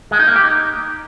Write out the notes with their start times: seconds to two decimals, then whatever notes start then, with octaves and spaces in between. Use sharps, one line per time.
0.11 G#3
0.19 D#4
0.27 A#3
0.36 G4
0.44 D#4